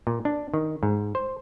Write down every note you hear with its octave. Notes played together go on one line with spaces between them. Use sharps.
A#2
D4
D#3
G#2
C5